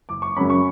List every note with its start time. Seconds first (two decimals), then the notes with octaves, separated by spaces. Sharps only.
0.09 F#1 D6
0.22 C#6
0.36 F#2 C#3 F#3 C#4 B5
0.50 C#6